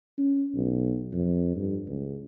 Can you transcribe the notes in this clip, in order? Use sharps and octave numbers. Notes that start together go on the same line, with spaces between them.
C#4
B1
F2
G2
C#2